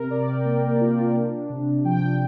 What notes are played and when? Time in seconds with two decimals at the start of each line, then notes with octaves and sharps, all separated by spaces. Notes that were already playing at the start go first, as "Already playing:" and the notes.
Already playing: C3 A#4
0.10 C3 D5
0.27 G5
0.45 A#3
0.81 F4
1.16 D4
1.50 C3
1.85 F3 G5